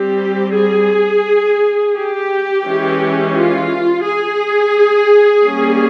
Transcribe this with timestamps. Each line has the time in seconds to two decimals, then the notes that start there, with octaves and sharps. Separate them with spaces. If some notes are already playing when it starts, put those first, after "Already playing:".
Already playing: G3 C4 G4
0.55 G#4
1.96 G4
2.65 E3 G#3 C#4
3.36 F4
4.05 G#4
5.45 G3 A#3 C#4